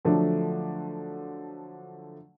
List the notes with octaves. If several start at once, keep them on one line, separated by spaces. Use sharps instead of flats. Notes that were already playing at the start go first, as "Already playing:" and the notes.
D3 F3 F#3 A3 D4